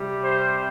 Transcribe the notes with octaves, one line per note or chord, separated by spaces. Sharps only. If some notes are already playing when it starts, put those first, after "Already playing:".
Already playing: C3 G3
C5